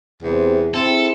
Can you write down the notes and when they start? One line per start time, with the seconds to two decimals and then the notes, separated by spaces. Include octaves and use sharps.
0.23 E2 C3
0.74 C4 E4 G#4 A4